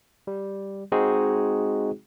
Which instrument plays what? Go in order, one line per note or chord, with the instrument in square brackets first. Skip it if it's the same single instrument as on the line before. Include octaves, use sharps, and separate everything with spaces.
[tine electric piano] G3
G#3 C4 D#4 F#4 G#4